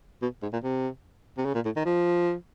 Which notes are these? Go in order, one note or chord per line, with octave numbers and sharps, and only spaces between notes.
B2
G#2
A#2
C3
C3
C#3
A#2
A2
D#3
F3